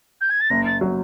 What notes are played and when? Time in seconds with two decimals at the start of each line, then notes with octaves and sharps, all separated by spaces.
0.21 G6
0.31 G#6
0.41 A6
0.50 F#1 A#6
0.66 A6
0.81 F#3